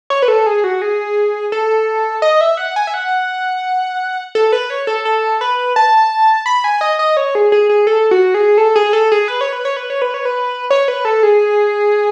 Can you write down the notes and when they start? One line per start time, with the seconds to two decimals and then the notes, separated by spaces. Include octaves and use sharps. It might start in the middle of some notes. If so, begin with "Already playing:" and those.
0.10 C#5
0.22 B4
0.28 A4
0.46 G#4
0.64 F#4
0.82 G#4
1.52 A4
2.22 D#5
2.41 E5
2.57 F#5
2.76 G#5
2.87 E5
2.94 F#5
4.35 A4
4.52 B4
4.70 C#5
4.87 A4
5.05 A4
5.41 B4
5.76 A5
6.46 B5
6.64 G#5
6.81 D#5
6.99 D#5
7.17 C#5
7.35 G#4
7.52 G#4
7.69 G#4
7.87 A4
8.11 F#4
8.34 G#4
8.58 A4
8.76 G#4
8.93 A4
9.12 G#4
9.28 B4
9.41 C#5
9.53 B4
9.65 C#5
9.77 B4
9.90 C#5
10.02 B4
10.14 C#5
10.25 B4
10.70 C#5
10.88 B4
11.05 A4
11.23 G#4